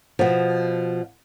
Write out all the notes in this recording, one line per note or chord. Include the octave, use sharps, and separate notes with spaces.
B2 F3